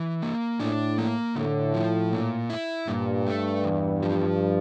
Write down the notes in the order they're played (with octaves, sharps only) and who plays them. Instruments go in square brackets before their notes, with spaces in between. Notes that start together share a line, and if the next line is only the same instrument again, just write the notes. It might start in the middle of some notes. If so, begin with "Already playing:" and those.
Already playing: [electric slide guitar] E3
A#3
[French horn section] A2 [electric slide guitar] D4
[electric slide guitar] A#3
[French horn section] A2 [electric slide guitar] D3
[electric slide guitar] F3
A#2
E4
[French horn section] G2 [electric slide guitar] A#2
[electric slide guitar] A3
E2
F3